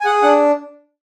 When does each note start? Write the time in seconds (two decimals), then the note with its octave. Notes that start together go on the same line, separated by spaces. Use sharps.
0.01 G#5
0.05 G#4 F#5
0.23 D4 F#5